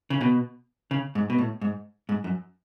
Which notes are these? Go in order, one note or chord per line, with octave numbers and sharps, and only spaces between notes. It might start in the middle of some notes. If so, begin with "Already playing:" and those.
C#3
B2
C#3
G#2
B2
A2
G#2
G#2
F#2